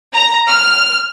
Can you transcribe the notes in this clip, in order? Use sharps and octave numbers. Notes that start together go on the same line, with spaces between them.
A#5
F6